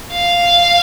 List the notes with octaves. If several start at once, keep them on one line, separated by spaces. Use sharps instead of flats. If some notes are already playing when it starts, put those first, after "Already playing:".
F5